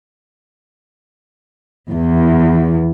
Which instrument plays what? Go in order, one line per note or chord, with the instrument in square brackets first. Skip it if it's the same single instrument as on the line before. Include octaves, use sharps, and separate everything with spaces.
[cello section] E2